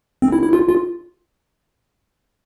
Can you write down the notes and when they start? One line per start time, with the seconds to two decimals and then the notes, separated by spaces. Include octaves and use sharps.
0.22 C4
0.33 E4
0.43 E4
0.53 F4
0.69 F4